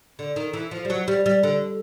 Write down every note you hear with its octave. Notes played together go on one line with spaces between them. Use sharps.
D3
D#3
E3
F3
G3
F#3
G3
G3
D3